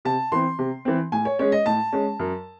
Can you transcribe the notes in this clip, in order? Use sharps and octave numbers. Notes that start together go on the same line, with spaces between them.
C3 A5
E3 C4 C6
C3
E3 C4
A2 G#5
C#5
G#3 C#4 C#5
D#5
A2 A5
G#3 C#4
F#2